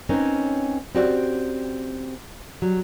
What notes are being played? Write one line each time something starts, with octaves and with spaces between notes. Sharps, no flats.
C4 C#4 D#4 A#4 B4 C#5
C4 C#4 F#4 G4 D5
F#3 G3